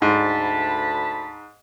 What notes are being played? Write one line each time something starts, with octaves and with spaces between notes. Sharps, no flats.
D2 G#2 A5 B5